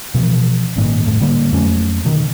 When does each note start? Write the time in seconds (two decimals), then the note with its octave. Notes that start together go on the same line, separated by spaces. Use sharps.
0.14 B2 E3 F3
0.76 G#1 G2 A#2 D#3
1.06 F1 A2
1.20 D3 G3 A#3
1.52 F2 F#3 A3 C#4
2.05 B2 D3 D#3